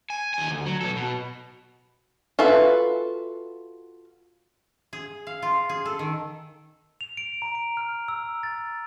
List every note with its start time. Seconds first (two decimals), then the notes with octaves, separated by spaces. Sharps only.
0.10 G#5
0.34 D#2 G#5
0.51 D2
0.66 F#3
0.81 B1 A4
0.96 B2
2.39 F4 F#4 A4 B4 E5
4.93 G#4
5.27 F5
5.42 F4
5.69 G#4
5.85 A4
5.99 D#3
7.01 F7
7.17 D7
7.42 A#5
7.55 D7
7.77 F6
8.08 E6
8.43 A6